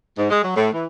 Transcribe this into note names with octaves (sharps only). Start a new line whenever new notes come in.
G#2
G#3
F#3
A2
E3